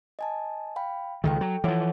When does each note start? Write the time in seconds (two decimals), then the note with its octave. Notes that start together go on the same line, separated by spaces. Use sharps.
0.19 D#5 G#5 A5
0.76 F5 G5 B5
1.24 C#2 D#3 A4 G5
1.41 F#3
1.64 E3 F3 A4 C#5 F#5